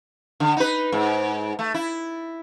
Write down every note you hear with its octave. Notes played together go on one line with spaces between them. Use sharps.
D3
D#4 B4
G#2
A3
E4